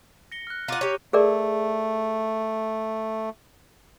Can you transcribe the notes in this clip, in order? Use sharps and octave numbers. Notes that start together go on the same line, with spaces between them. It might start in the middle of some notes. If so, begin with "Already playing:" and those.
A#6 C#7 G7
F6 F#6
F4 F#5 A#5 D6 D#7
G4 C#5
A3 G#4 A#4 D5